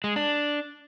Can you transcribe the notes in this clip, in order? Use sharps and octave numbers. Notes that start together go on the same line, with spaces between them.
G#3
D4